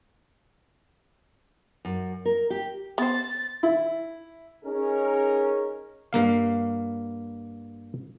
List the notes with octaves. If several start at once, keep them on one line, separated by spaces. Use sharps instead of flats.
F#2
A#4
G4
B3 C5 A6
E4
C#4 D#4 G#4 A#4
G2 A#3 F5